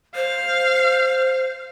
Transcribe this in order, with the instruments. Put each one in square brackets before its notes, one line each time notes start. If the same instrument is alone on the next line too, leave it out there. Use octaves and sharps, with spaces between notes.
[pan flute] C5 [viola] F5